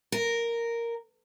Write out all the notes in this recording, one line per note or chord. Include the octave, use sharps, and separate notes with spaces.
A#4